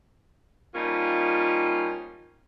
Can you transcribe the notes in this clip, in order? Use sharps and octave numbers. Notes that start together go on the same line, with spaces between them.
F3 G3 A#3 C#4 D#4 F4